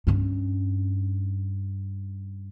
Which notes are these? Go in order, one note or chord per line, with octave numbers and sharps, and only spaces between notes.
G2 C#4